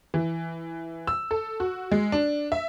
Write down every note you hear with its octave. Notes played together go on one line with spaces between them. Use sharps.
E3
E6
A4
F#4
G#3
D4
E5